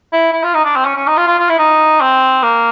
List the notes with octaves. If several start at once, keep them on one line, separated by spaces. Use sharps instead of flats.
E4
E4
F4
D#4
D4
C4
C#4
C#4
D#4
F4
F4
F4
E4
D#4
C4
A#3